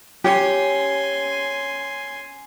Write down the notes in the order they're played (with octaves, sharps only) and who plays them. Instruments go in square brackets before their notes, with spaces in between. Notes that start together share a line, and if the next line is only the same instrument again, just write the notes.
[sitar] C#4 C#5 [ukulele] G4 [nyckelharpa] G#5 C6